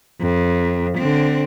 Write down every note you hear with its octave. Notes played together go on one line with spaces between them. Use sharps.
F2
D3 C4